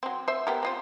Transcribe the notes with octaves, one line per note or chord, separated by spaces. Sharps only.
F#3 C4
C5 E5
B3 G4 A#4
C4 F4 C5